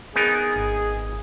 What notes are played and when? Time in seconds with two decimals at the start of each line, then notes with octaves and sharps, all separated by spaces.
0.16 B3 D#4 G#4 A#4
0.56 G#1